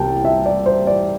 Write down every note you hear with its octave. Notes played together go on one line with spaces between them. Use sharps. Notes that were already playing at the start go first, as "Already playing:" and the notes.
Already playing: C2 C3 E3 G5 A5
E5
D5
C5
D5